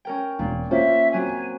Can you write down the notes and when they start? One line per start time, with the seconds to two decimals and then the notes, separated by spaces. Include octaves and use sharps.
0.05 C#4 A#4 G5
0.39 E1 A#2
0.71 A#3 C#4 F4 C5 E5
1.12 F#3 C4 G#5